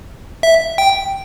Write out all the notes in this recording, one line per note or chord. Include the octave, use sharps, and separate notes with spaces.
E5
G5